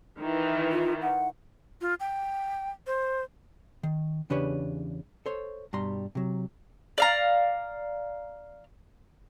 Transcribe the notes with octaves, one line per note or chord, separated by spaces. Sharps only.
D#3 E3
F4
F#5
F4
G5
C5
D#3
E2 C#3 D4 G4 B4 C#5
A4 C5 C#5
G2 B2 G3 A#5 C6
C3 F#3
D5 F5 A#5